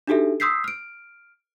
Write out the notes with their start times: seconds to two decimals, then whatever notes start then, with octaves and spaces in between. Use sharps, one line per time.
0.07 D4 D#4 F#4 G4 A4 E5
0.40 C6 D#6 E6 G6 B6 C7
0.64 F6 D7